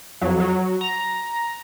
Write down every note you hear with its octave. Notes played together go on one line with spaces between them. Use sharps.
F2 F#3
F#3
A#5